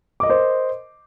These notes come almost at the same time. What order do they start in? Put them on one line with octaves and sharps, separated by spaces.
D6 D#5 A#4 C5